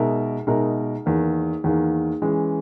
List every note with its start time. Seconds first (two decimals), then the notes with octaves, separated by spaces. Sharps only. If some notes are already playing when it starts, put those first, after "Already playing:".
Already playing: B2 G#3 D#4 A#4 E5
0.47 B2 G#3 D#4 A#4 E5
1.06 E2 D#3 A#3
1.64 E2 D#3 A#3
2.22 E3 G#3 C#4